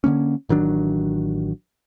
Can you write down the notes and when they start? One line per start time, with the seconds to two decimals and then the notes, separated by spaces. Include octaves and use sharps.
0.04 D3 F3 A#3 C#4
0.49 A1 D#3 F#3 D4